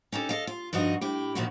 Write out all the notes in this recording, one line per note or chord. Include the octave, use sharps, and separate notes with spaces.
C#4 D#4 G4 A4
A4 D#5 F5
F4
G2 F3 D#4 F#4 D#5
A2 E4 G4
A#2 D#3 F3 C4 E4 F#4